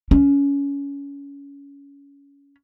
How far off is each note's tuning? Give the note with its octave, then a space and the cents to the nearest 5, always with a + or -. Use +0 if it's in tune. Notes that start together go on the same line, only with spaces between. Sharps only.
C#4 +20